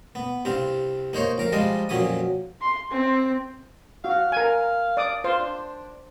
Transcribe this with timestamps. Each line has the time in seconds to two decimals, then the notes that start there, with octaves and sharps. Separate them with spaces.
0.15 B3
0.45 C2 G2 C4 F5
1.13 A#3 D#4 C5 C#5
1.38 F2 A#4 F5
1.52 F3 G3 G#3 D4 F4 D#5
1.89 F2 A#2 F#3 C#4 G#5 D#6
2.62 C6
2.91 C4
4.05 F#4 F5
4.32 A#4 G#5
4.97 D5 D6 D#6
5.24 F4 C5
5.40 D4